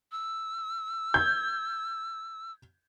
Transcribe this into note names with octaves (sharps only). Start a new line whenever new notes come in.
E6
G6 G#6